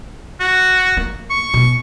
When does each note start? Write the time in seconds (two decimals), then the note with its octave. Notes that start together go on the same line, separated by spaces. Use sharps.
0.40 F#4
0.97 A#3
1.30 C#6
1.54 B2